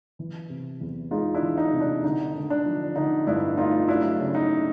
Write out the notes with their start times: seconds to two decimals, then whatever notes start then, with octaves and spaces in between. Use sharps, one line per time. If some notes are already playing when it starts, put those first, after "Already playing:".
0.19 E3
0.50 C3
0.81 E2
1.11 G#3 D#4 F4
1.34 D4 E4
1.42 E3
1.58 D#4
1.73 C3
1.81 D4
2.04 D3 D#4
2.34 D3
2.50 D4
2.65 F3
2.96 D3 D#4
3.27 G2 D4 E4
3.57 A3 D#4 F4
3.88 F#3 D4 E4
4.19 C#3
4.35 D#4